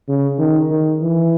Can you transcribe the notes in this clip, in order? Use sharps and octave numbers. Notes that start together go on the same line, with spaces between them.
C#3
D#3
D#3
E3